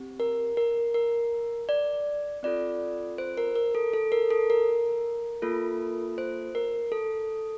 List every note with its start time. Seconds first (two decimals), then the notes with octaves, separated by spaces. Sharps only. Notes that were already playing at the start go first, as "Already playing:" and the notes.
Already playing: C4 G4
0.20 A#4
0.57 A#4
0.94 A#4
1.69 D5
2.43 C4 F4 A4 D5
3.18 C5
3.37 A#4
3.55 A#4
3.75 A4
3.94 A4
4.12 A#4
4.31 A4
4.50 A#4
5.42 A#3 F4 A4
6.18 C5
6.55 A#4
6.92 A4